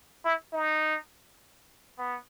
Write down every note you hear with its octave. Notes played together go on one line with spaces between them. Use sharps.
E4
D#4
B3